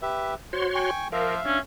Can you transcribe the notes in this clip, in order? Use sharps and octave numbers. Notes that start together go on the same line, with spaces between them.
G4 B4 E5
F#4 C5 C#5 C6
G5 G#5 C#6
F3 A#4 E5 F5
C#4 D4